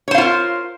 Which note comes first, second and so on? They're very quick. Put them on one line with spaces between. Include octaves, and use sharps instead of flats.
C#5 C5 F5 F4 A#4